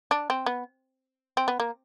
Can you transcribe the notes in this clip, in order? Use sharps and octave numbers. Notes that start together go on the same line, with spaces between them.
D4
C4
B3
C4
B3
A#3